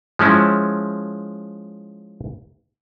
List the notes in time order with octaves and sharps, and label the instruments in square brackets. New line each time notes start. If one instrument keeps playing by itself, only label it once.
[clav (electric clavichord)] F3 G#3 C#4 E4